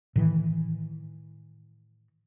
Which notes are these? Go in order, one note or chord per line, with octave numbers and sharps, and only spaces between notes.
A2 D#3 E3